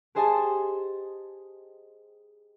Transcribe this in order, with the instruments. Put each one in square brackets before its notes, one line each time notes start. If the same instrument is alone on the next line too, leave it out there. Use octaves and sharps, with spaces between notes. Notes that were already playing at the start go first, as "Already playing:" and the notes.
[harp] G4 G#4 C5 D#5 G#5 A5